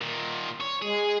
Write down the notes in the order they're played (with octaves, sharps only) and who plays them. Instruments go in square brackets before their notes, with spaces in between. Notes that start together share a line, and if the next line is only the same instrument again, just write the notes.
[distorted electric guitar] A#2 D#3
C#5
[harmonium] G#3 [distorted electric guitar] G#4